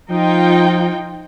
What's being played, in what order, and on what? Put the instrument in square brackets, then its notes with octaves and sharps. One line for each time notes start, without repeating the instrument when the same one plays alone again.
[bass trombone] F3 [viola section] D#4 F4 G5